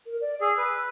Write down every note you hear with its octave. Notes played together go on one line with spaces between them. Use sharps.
A#4
D5
G#4 E6
B4